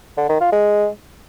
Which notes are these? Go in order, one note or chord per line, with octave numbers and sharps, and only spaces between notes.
D3
D#3
F4
G#3